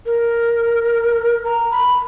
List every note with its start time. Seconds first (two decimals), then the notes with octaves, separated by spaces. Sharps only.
0.06 A#4
1.45 A#5
1.71 B5